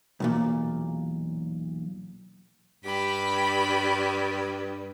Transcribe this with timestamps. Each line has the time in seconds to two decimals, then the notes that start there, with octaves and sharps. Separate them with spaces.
0.20 B1 E2 A#2
2.84 G2 G4 B5